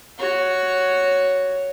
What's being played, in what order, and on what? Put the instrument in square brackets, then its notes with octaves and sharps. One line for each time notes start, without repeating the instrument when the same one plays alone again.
[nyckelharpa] F#4 C#5